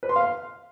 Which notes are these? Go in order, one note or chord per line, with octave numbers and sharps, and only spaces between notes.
B4
C6
F5